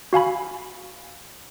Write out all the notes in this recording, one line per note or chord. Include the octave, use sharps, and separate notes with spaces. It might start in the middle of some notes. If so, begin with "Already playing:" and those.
F#4 F5 G#5 B5